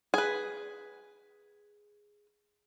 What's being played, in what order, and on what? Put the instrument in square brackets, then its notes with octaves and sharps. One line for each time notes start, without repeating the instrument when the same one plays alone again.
[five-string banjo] G#4 B4